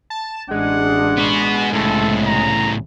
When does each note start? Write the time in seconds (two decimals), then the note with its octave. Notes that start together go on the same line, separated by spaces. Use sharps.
0.10 A5
0.51 A1 G#3 D4 F#5
1.17 B3 F#4
1.73 C2 A2 C#3 A4
2.27 A#5